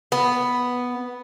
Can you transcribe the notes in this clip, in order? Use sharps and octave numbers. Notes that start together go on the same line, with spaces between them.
B3